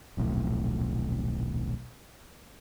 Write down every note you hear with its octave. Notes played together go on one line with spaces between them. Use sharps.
D#1 B1 F2 A2